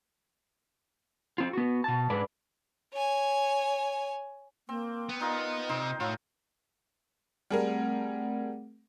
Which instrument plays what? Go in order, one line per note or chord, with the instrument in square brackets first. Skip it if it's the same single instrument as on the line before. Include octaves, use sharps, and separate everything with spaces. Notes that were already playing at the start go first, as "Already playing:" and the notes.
[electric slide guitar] C4 F4
B3 F#4
B2 A5
G#2 D4 B4 D5
[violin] C#5 G#5
[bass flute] A#3 [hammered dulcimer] C4
[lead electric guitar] B3
[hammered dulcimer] D#4 F4 A#4 [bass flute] D#5
[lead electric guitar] C3 [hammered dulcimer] D#4 C5
[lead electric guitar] A2 [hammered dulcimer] F4 [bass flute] C#5
[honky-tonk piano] G3 G#4 A#4 [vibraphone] A3 C4 F#5